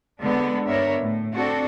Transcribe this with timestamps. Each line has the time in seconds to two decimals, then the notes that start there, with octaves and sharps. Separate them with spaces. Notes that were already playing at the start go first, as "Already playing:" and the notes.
0.20 D3 G#3 B3 D4
0.66 G2 B3 D4 A#4 C#5 E5
0.98 A2
1.34 C4 D4 F#4 A4 D5